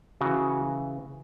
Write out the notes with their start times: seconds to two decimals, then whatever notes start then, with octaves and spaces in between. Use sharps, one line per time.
0.21 C#3 E3 F#4